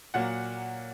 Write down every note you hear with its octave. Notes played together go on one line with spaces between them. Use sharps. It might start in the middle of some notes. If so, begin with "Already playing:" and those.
A#2 F#3 A#3 F#5